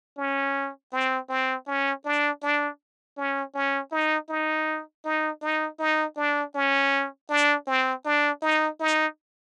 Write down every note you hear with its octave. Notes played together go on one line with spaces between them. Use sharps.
C#4
C4
C4
C#4
D4
D4
C#4
C#4
D#4
D#4
D#4
D#4
D#4
D4
C#4
D4
C4
D4
D#4
D#4